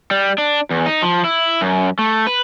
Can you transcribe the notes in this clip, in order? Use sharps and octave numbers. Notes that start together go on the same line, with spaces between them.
G3
D4
E2
D#4
F3
E4
F#2
A3
B4